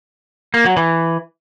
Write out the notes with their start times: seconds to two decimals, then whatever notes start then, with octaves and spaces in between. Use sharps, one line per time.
0.54 A#3
0.65 F#3
0.77 E3